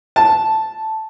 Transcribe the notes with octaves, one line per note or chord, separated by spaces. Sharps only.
A5